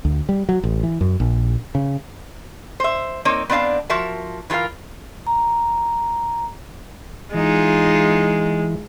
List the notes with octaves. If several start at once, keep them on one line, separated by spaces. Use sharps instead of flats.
D2
G3
F#3
A1
E3
F#2
A#1
C#3
C5 E5
A#3 C4 D#4 C#5
B3 C4 D4 D#5 F5 A5
F3 F#4 A#4 E5 A5
E3 F4 A#4 B4 F5
A#5
E3 G#3 D#4 F4